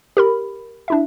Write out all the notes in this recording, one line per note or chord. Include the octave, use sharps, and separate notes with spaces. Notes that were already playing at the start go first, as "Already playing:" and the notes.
G4 A#4 B5
D4 E4 E5